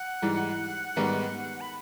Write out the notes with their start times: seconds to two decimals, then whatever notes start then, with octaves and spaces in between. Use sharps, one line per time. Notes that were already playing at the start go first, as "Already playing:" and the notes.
Already playing: F#5
0.22 G#2 E3 G3
0.96 G#2 D#3 G3 B3
1.61 B5